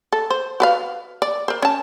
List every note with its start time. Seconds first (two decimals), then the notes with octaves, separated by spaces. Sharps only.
0.12 A4
0.30 C5
0.60 F#4 B4 F5
1.22 D5
1.48 A#4 C5
1.62 C#4 A5